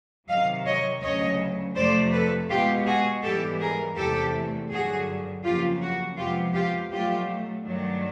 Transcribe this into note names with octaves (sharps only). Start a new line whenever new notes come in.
C3 D#3 F#3 D#5 F5
C#5 D#5
D2 C#3 F#3 C#5 D#5
F2 C3 F3 A3 C5 D5
A4 B4
B2 G#3 B3 F4 G4
F#4 G#4
G#2 E3 G3 B3 G4 A4
G#4 A#4
E2 C3 E3 A3 G4 A4
G2 D3 F#3 F#4 G#4
F2 C#3 F#3 A#3 F4 G4
F#4
F2 C3 F3 G#3 B3 F4 G4
F4 G4
B2 F#3 A3 F4 G4
G2 D#3 F#3 A3 D4